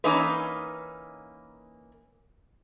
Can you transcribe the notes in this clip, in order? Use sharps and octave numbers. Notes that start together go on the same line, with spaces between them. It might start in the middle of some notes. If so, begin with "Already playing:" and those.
E3 A#3 C#4 D#4 B4